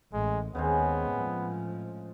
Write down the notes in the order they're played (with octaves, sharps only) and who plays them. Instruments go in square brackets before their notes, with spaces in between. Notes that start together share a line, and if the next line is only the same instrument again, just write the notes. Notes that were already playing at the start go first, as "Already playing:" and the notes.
[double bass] A1 [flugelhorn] G#3
[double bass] D#2 [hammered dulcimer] C#3 G#3 C4 [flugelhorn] B3
[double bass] A2 F3